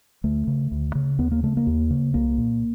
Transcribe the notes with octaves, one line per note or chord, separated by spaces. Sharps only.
D2 A3
C#3
D2
C#3
D#2 B3
A#3
C#3 A3
A#3
D#2
C#3
C2 A#3
A#2